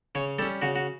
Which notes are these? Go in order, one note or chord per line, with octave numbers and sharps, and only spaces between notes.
C#3 C#5
G3 C#4 A4
C#3 F#4
F#4